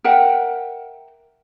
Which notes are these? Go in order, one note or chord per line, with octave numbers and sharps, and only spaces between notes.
A#4 E5 F#5 G5